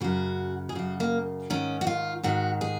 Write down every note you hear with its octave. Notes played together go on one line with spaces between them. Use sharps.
F#2 C#3 F#4
G#4
F#2 C#3 F#4
A#3
G#2 D#3 C#4
F#4
F4
G#2 D#3 F#4
G#4